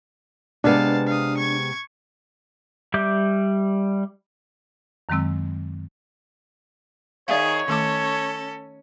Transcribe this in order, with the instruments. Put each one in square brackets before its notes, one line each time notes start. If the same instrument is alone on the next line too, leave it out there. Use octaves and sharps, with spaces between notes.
[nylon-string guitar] C3 G#3 B3 [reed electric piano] D4 [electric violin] F5 A5
[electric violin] F5 D#6
C#6 G#6
[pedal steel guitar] G3 E5 D6 G6
[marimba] F#2 D#3 F#3 G#3 C4 E6
[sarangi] D#3 [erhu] G#4 [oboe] C#5 [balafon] D5 E5 F5
[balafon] D#3 A3 D6 [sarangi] C#4 [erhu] A4